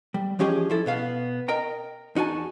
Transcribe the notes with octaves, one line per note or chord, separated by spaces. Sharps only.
G3
E3 F3 C#4 G4 G#4 D#5
F3 E4 A4
B2 B3 F5
A#4 D#5 G5 A#5
E2 D#4 F#4 G#5 A5